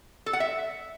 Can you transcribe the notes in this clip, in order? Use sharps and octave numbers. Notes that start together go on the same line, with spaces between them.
A4
F#5
E5